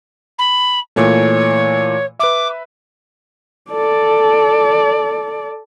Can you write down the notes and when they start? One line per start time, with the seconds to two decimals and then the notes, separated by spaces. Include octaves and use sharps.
0.38 B5
0.96 A#2 E3 A3 C#5
2.19 B4 E5 D6
3.71 A4 D5